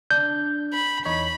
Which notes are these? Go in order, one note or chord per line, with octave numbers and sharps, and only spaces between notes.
D4 G6
B5
E2 D#4 C#5 B5